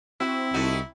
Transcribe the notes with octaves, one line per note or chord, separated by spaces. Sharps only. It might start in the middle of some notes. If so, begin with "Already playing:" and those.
C4 E4 F#4
C2 A3 D#4 F#4